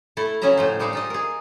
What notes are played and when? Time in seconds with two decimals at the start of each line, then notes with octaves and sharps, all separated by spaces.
0.17 A3 E4 A4
0.42 C#3 F#3 C#4 D#5 E5 A#5
0.57 A2 F3 C5
0.79 G3 G#3 D#4 F5
0.93 D#4 F4 D#5
1.10 G#4 A#4